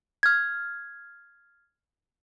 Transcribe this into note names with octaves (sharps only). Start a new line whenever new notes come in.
F6 G#6